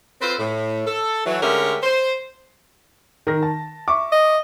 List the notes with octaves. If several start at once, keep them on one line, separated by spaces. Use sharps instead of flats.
C4 F4 A4 B4 C5
A2
A4
E3 F#3
D3 G#3 A3 C#4 G4 A#4
C5
D#3 A#4 A#6
A5
E5 C#6 D6
D#5